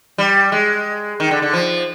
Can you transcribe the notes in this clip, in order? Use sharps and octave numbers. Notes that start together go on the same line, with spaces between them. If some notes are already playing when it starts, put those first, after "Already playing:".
G3
G#3
D#3
D3
D3
F3